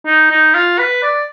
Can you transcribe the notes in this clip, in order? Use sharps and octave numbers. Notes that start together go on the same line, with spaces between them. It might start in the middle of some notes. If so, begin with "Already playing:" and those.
D#4
D#4
F4
B4
D5